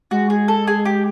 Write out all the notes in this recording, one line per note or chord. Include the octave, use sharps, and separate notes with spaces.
G#3 F#4
G#4
A4
G#4
G4